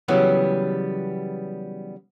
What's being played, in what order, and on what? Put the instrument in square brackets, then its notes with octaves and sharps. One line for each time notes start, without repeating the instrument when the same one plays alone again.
[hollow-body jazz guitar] C#3 E3 F#3 G3 B3